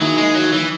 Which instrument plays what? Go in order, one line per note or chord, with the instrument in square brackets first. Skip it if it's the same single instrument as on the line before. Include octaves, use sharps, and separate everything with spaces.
[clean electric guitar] D#3 A#3 E4 G#4 [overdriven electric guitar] F#3
[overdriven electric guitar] G#3
F#3
E3